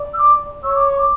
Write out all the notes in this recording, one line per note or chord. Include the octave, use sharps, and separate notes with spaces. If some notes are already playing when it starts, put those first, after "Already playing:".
Already playing: D5
E6
D6
C#5 E6
D6
C#6
D6